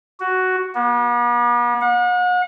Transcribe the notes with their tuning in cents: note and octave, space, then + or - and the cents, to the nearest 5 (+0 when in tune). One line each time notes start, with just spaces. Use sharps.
F#4 +5
B3 -45
F#5 -40